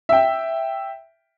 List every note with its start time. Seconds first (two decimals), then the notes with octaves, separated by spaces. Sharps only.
0.09 E5 G5